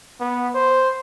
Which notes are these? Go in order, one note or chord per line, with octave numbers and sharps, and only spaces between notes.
B3
C5